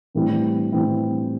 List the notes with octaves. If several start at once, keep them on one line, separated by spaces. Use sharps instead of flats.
A2 E3 G3 C4 E4
A2 E3 G3 C4 E4